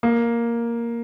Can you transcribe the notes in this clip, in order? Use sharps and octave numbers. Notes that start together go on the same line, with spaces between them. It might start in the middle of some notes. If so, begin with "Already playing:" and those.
A#3